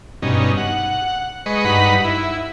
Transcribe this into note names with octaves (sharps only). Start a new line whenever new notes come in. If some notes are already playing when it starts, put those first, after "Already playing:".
G2 B2 C#4 D#4
F#5
G#3 B4 D#5 C#6
G2 D#4 B4 F#5 B5
E4